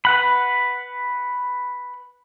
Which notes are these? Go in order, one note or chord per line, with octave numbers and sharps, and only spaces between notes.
B4 F#5 B5